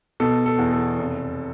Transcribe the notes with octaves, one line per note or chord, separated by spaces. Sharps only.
B2 A4
A4
E2
A4
F1